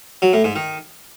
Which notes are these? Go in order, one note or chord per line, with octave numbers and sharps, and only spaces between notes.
F#3
A2
G#2
D#3